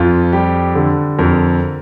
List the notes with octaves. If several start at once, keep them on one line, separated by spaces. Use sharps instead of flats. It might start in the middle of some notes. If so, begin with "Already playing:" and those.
Already playing: F2 F4
G3 G4
D3
F2 A#4